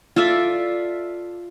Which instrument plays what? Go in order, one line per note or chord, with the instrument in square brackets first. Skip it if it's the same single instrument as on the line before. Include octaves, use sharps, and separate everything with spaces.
[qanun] F4 A4 D5 E5